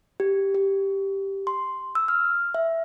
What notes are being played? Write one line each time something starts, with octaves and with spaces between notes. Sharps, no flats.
G4
G4
C6
E6
F6
E5